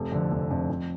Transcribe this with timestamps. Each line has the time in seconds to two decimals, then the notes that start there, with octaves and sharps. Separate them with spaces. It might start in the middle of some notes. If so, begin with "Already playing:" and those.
Already playing: F1
0.12 F2 D3
0.31 F1
0.51 F2 D3
0.69 F2